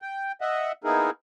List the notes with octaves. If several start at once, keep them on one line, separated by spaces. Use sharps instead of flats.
G5
D#5 E5 F#5
A#3 B3 D#4 E4 G#4 A#4